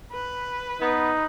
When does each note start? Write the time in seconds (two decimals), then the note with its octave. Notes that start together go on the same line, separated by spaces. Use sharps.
0.12 B4
0.81 B3 D#4